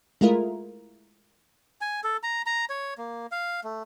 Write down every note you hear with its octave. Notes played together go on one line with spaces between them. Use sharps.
G#3 A3 E4 F4 A#4
G#5
A4
A#5
A#5
C#5
A#3
F5
A3